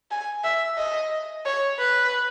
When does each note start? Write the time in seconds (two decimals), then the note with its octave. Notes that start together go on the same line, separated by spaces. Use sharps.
0.11 G#5
0.44 E5
0.78 D#5
1.45 C#5
1.79 B4